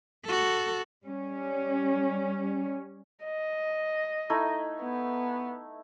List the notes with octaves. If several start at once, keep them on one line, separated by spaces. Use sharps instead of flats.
F#4 A4
G3 C#4
D#5
A3 D#4 E4
B3